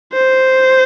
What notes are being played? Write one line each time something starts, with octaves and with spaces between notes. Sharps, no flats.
C5